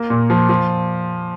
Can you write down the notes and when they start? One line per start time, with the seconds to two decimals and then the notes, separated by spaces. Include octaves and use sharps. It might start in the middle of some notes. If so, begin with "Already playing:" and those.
Already playing: A#3
0.10 A#2
0.30 F3
0.49 F3